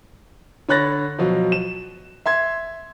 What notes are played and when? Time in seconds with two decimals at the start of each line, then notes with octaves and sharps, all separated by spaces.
0.69 D3 C#5 B5 F#6 A6 A#6
1.18 B2 F3 F#3
1.52 E7
2.26 E5 C6 G#6